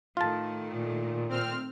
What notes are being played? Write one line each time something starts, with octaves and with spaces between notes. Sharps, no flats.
A2 D#3 A3 F4 A5
A#2
C4 F6